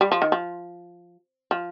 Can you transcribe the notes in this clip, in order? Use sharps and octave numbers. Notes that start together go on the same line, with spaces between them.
G3
F3
D#3
F3
F3